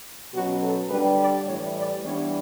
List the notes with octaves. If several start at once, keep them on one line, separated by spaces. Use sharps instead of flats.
B2 F#3 C#4 F#4
A4
D3 G3 D4 B4
D5
A2 E3 G3 C#5
D5
E3 G3 B3 D4 C#5